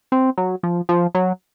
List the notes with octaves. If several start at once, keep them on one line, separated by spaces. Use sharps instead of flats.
C4
F#3
F3
F3
F#3